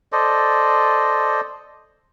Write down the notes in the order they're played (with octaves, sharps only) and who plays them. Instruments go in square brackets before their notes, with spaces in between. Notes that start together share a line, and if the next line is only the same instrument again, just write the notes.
[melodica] A4 C5 D5 D#5